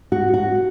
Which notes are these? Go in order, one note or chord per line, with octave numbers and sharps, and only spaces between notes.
F#4
F#4